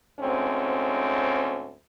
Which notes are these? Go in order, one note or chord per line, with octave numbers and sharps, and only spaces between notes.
D2 G#2 C4 C#4